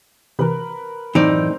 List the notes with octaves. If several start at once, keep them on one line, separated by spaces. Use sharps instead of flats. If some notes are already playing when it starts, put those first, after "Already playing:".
C3 E3 A#4 B4
F#2 A2 E3 C4 D#4 D5